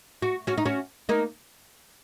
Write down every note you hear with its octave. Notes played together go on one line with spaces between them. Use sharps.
F#4
C#4 F#4
D#4
C#4 F#4
A#3 D#4